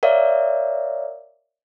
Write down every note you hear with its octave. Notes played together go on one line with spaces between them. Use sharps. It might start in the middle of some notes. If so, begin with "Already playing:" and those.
A#4 C#5 D5 E5 F5